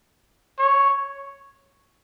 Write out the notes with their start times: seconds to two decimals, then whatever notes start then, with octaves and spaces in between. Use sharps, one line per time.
0.59 C#5